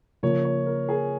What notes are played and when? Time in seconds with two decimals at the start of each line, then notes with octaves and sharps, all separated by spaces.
0.23 C#3 F3 A#3 C#5
0.44 C#5
0.66 A#4
0.89 G#4